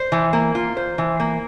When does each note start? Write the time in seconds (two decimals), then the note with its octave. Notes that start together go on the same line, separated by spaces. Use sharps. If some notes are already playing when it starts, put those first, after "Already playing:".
Already playing: C5
0.12 E3
0.33 A#3
0.55 F4
0.77 C5
0.98 E3
1.20 A#3